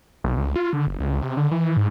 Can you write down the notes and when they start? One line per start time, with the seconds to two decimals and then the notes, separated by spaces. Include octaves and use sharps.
0.24 B1
0.37 C#2
0.56 F4
0.73 D3
0.87 F#1
1.00 C#2
1.22 C3
1.37 D3
1.51 E3
1.77 G#2